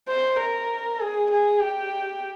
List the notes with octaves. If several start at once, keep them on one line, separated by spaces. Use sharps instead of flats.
C5
A#4
G#4
G#4
G4